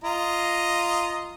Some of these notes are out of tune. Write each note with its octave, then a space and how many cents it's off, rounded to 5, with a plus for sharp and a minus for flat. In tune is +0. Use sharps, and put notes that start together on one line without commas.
F4 -10 D#5 +0 A#5 +0